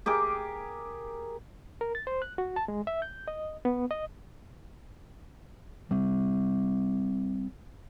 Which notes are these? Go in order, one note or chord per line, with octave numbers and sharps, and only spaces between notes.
G4 G#4 A#4 D6
A#4
A6
C5
F#6
F#4
A5
G#3
E5
G6
D#5
B3
D#5
G3 C4